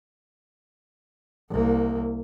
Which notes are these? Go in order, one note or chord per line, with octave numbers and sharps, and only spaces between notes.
C2 A#3